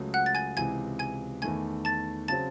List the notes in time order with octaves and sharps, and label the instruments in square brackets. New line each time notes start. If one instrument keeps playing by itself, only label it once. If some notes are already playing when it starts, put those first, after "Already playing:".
Already playing: [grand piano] C#2 C#3 F#3 A3
[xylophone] F#5 F#6
A6
G#5 G#6
[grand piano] C#2 C3 E3 [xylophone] G#5 G#6
[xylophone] G#5 G#6
[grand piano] E2 D#3 A3 [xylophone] G#5 G#6
[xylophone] A5 A6
[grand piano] C#3 F#3 C4 [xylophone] A5 A6